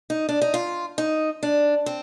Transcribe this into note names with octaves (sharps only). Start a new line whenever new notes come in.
D#4
D4
D#4
F4
D#4
D4
C4